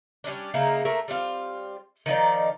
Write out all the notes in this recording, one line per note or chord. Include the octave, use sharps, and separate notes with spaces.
G3 G#3 C#4 D4
C#3 A#3 D#4 E4
A3 A#3 A#4 E5
G3 C4 F4
D#3 F3 D#4 D5